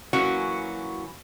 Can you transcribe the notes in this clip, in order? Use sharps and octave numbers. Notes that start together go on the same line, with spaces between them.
E3 F#3 A#3 C#4 F#4